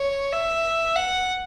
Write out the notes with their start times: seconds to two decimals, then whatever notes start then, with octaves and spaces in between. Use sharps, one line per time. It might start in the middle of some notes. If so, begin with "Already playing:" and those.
Already playing: C#5
0.32 E5
0.96 F#5